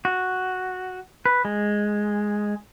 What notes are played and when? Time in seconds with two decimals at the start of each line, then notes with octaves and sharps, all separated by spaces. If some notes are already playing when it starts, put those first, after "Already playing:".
0.05 F#4
1.26 B4
1.45 G#3